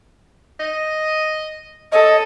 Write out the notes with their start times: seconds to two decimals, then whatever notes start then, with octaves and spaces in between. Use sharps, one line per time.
0.60 D#5
1.92 A4 C#5 D#5